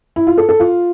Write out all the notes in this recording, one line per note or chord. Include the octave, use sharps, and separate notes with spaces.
E4
F4
A4
A4
F4